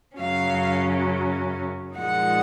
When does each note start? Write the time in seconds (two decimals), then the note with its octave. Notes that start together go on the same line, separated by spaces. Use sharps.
0.19 F#2 C#3 F#3 C#4 F5
1.97 A#2 F3 G#3 D#4 F#5